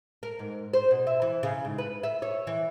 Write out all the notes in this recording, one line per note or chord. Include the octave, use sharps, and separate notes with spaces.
A#4
G#2
C5
B2
E5
E3
C#3
G#2
B4
E5
C#5
E3